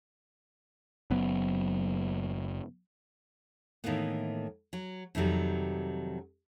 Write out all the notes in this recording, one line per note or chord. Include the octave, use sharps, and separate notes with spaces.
F#1 F#3 B3
A2 D#3 E3 A#3 B3
F#3
F2 C3 D#3 F#3 G3